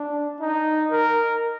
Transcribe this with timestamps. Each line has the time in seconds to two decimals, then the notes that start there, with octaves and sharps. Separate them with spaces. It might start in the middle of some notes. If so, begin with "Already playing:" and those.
Already playing: D4
0.41 D#4
0.91 A#4